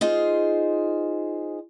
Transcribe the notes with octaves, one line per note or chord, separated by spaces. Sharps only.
D#4 F4 G#4 C5